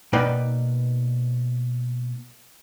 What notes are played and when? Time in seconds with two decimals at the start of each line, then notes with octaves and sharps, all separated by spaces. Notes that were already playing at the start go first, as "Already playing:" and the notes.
0.13 B2 A#3 D#4 B4 D5 G5